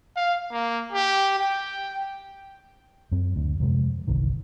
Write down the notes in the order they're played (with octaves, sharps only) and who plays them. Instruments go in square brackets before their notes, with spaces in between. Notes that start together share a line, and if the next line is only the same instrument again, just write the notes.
[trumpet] F5
A#3
G4
G5
[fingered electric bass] F#2 C4
D2
F2 C3 G#3
G1 C2 D#3